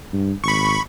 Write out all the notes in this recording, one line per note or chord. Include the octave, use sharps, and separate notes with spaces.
G2
G#1 B5 C#6